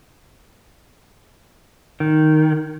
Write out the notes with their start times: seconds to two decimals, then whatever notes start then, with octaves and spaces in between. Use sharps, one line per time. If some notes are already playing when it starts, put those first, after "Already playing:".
2.00 D#3